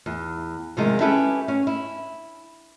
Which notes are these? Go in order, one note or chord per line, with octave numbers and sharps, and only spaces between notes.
E2
C3 D#3 F3 G#3
C#4 E4 G4 A4 B4 E5
C#4
E4